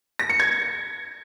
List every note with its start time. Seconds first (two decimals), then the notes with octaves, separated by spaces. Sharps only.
0.19 A#6
0.30 C#7
0.40 G#6